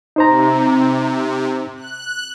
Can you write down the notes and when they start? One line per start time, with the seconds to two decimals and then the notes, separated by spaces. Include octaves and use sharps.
0.16 C3 D#4 C5 A#5
1.76 F#6